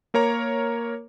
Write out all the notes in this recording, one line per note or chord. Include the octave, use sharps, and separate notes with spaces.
A#3 A#4 C#5 A#5